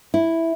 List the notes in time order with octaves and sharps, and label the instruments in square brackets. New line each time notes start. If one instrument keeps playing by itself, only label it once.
[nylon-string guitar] E4